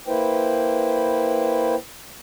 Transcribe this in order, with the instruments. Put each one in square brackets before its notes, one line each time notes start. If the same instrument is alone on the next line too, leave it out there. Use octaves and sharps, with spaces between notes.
[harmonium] A#3 E4 B4 C5 G5